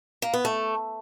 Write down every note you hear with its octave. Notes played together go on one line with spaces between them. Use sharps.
A#3
B3
A3